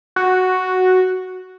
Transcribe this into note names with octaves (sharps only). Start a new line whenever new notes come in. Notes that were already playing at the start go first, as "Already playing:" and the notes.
F#4